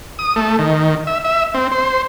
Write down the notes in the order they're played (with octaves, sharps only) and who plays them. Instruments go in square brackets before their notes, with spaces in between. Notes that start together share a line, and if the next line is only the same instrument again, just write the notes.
[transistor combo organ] D#6
A3
D#3
E5
E5
C4
C5